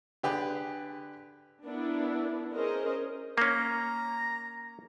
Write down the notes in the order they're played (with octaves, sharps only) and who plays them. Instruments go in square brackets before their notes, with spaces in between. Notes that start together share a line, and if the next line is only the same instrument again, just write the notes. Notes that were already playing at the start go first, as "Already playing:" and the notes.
[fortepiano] D3 G4 G#4 B4
[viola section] B3 D4 E4 A#4
C#4 G#4 A#4 C5 D#5
[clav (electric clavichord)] A#3 C#4 [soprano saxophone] A#5